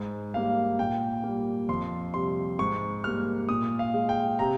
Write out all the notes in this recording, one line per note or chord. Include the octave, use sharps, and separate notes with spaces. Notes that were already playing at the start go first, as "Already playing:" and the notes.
Already playing: G#2
G3 A#3 F5
A#2 G5
G3 A#3
F2 C6
C3 G3 C6
G#2 C#6
G3 A#3 F6
A#2 D#6
F5
G#3
G5
C3 A#5